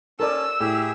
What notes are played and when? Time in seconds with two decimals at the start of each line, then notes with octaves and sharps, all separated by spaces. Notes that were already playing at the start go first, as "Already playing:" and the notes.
0.20 C#4 A4 A#4 D5 A5 E6
0.60 A2 G4 G#4 E5